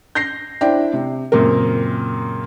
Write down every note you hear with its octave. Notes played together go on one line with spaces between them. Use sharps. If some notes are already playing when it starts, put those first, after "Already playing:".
G6 A#6 C7
D4 E4 C5 G5
C3
F#2 A#2 C#3 C4 A#4